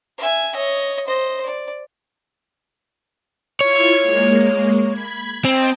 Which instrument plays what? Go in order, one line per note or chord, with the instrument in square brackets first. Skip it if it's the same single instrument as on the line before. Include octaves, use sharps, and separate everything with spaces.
[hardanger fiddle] E5 G#5
C#5 D#5
C5 D#5
D5
[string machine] E4 F4 G#6 [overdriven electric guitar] C#5
[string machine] G#3 A#3
B5 G#6
[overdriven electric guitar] C4 [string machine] D#5 G5 A5